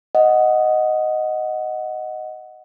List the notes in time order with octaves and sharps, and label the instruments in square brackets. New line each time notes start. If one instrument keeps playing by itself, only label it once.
[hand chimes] D#5 F#5